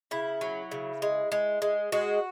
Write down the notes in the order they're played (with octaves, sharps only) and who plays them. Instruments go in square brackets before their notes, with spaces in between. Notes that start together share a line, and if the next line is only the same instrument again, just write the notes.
[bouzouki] C#3 E4
F#3
C#3
G#3
G#3
G#3
G#3 F#4